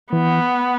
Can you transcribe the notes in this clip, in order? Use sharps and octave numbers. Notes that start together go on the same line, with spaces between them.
E3 B3